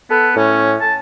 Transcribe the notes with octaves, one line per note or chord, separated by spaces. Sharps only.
B3 A4
A2 C#4
A5